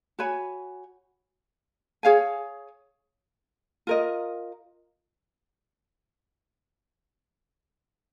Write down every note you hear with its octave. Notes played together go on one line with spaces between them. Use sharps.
F#4 C#5 G#5 B5
G#4 C#5 F5 G#5
F4 A#4 D#5